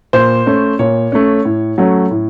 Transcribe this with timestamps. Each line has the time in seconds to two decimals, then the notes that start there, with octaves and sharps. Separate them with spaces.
0.13 A#2 C5
0.46 A3 C#4
0.79 A#2 C#5
1.12 A3 C#4
1.45 A2
1.78 F#3 A3 C#4
2.11 A2